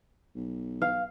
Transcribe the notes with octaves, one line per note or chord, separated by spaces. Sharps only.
B1
B4 F5 F6